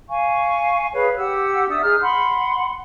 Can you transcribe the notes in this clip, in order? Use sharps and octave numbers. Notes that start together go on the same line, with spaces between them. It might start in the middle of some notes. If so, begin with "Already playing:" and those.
F5 G#5 C#6
G#4 B4 C#5 F5
G4 F#5 E6
D4 E5 D#6 E6
D#4 G#4 F6
F#5 B5 C6